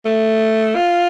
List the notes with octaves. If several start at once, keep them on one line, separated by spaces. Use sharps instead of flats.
A3
F4